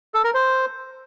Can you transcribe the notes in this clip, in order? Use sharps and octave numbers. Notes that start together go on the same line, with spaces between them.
A4
A#4
C5